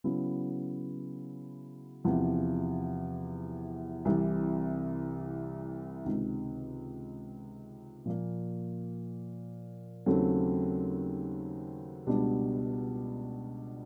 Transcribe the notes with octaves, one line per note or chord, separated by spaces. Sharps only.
C#3 F#3 B3 E4
E2 C3 F3
C2 C3 E3
C#2 C3 D#3
A#2 F3 A#3
D#2 C#3 F#3 A3 C4
C#2 B2 G3 B3 D4